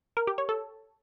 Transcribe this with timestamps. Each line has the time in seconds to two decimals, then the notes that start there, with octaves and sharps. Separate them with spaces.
0.17 A#4
0.27 G4
0.38 C#5
0.49 A4